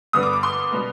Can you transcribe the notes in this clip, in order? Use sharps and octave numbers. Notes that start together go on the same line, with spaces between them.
G2 D3 G3 B3 D#6
D6
D6
C6
B2 G3 B3